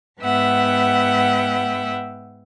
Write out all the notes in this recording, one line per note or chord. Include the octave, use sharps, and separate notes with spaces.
G#2 B3 E5 F#5 G5